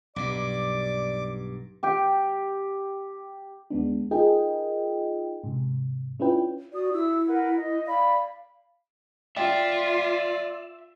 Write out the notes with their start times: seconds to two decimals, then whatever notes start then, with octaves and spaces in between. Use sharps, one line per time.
0.16 B1 G2 D5 D6
1.83 G4 G5
3.70 D2 G#3 B3 D4
4.11 D#4 F4 G#4 A#4 D#5 G5
5.44 G#2 C3
6.20 C#4 D4 E4 F4 B4 G5
6.74 F#4 D5 D#6
6.93 E4 E5 E6
7.27 A#4 B4 F#5
7.55 D#5
7.87 D5 F5 B5
9.37 F4 D5 E5 G5